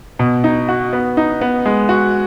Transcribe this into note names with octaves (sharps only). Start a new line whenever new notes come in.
B2
D#4
F#4
B3
D#4
B3
G#3
F#4